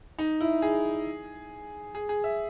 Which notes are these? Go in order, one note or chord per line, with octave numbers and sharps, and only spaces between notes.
D#4
E4
G#4
G#4
G#4
E5